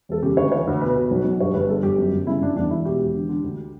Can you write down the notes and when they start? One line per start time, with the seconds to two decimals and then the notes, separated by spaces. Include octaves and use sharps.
0.09 E1 A4
0.23 C#3 G4
0.37 D2 C#5
0.52 E3 C#5
0.67 D2
0.81 B2 B4
0.96 B2
1.11 B1
1.25 B1
1.40 G2 C#5
1.54 G1 B4
1.69 D3 A4
1.83 G1 G4
1.98 F#2
2.13 G1
2.27 C#3 E4
2.41 G1 D4
2.56 E2 D4
2.71 E1 E4
2.85 B2 G4
3.00 E1
3.14 D3
3.29 D3
3.44 D2